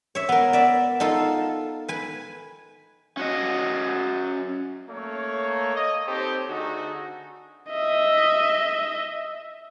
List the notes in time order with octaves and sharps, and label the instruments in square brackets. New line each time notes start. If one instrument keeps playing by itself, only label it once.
[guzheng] C#5 E5
[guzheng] B3 A#4 [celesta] F#5
[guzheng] D5 E5
D#4 F4 A4
B4 G#5
[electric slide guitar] C#4 F#4 D#5
[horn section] A3 A#3 C#5
D#5
C4 D#4 G4 A4 C5 C#5
D3 A3 D#4 F#4 G#4 D#5
[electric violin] D#5 E5